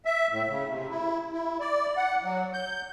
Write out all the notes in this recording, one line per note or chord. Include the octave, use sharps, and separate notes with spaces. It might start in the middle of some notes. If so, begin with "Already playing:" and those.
E5
A2
C#3
C3
E4
E4
D5
F#5
F#3
G6